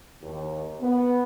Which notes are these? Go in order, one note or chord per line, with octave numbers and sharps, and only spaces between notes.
D#2
B3